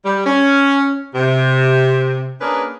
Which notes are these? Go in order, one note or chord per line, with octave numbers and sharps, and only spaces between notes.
G3
C#4
C3
A#3 C#4 D4 G#4 A#4 B4